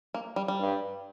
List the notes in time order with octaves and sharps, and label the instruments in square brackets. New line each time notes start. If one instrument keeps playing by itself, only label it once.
[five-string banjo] A#3
G3
G3
[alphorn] G2